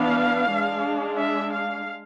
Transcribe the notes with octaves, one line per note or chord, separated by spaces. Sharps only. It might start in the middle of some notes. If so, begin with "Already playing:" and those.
Already playing: E3 B3 D4 F5
G#3 D4
E5
F5